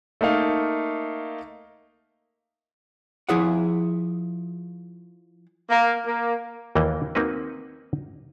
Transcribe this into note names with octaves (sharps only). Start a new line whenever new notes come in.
A3 A#3 D#4 F5
F3 E4 G#4 E5 F#5
A#3
A#3
D#2 E3 A#3 D5 G5
A#3 C4 D#4 F#4 B4